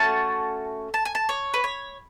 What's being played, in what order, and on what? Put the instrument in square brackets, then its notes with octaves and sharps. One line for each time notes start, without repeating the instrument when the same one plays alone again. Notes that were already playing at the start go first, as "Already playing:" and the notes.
Already playing: [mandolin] A3 C#4 F#4 A5
A5
G#5
A5
C#5
B4
C#5